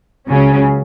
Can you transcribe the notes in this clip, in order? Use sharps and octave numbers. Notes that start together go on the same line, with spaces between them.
C#2 C#3 F#3 C#4